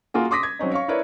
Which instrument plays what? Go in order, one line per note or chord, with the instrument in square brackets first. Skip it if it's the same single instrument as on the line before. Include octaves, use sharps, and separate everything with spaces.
[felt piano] A#3 F4 F#4 G#4
C6 D6 D#6 A#6 B6
G#6
F#3 C4 C#4 D#4
C#5 F5 C#6
E4 A#4 B4 C#5 D5